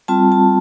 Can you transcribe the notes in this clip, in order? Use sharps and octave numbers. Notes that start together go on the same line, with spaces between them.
G3 C4 F4 A5
A5